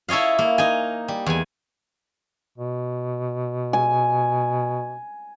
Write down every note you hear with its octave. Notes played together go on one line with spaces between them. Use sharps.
E4 A4 C#5 D#5 F5
A#3
D#4 G#5
G3
E2 G#5
B2
G#5